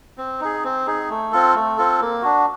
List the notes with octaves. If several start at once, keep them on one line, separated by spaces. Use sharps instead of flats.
C4
D#4 G#4
C4
D#4 G#4
A3
C4 F4 A4
A3
C4 F4 A4
A#3
D4 F#4